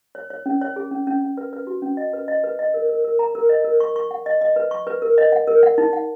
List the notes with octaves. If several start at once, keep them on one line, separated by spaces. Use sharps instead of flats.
C#5
C#5
C#4
C#5
G#4
C#4
C#4
C#4
B4
B4
F#4
C#4
D#5
B4
D#5
B4
D#5
A#4
A#4
A#4
A#5
A#4
D#5
A#4
C#6
C#6
F#5
D#5
D#5
B4
C#6
B4
A#4
D#5
F#5
A#4
F#5
D#4
F#5